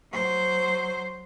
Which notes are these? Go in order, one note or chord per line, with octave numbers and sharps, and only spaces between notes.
F#3 C5